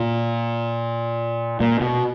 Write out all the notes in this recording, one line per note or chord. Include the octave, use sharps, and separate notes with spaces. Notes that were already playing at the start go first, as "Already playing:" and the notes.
Already playing: A#2
A#2
B2